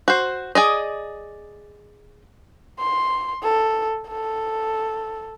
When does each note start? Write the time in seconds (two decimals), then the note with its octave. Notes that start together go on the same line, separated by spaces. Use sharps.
0.08 F#4 C5
0.55 G#4 D5 D#5
2.80 C6
3.43 A4
4.08 A4